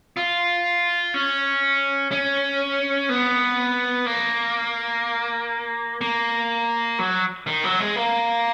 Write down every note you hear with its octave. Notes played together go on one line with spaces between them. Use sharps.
F4
C#4
C#4
B3
A#3
A#3
F#3
D#3
F#3
G#3
A#3